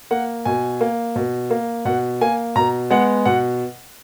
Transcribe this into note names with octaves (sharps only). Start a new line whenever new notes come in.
A#3 F#5
B2 G#5
A#3
B2
A#3
B2 F#5
A#3 G#5
B2 A#5
G#3 B3 F#5
B2 F#5